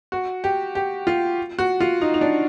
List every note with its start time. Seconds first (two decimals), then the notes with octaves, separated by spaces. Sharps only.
0.12 F#4
0.44 G4
0.75 G4
1.07 F4
1.59 F#4
1.80 F4
2.01 D#4
2.14 D#4
2.21 D4